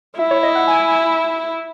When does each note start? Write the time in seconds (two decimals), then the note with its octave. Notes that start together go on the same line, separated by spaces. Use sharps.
0.19 E4 E5
0.31 C#5
0.43 D#5
0.55 F#5
0.67 G#5